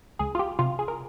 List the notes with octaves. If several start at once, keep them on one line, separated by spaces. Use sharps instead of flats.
C#2 G#4
F4
G4
C3 F4
G#4
A#4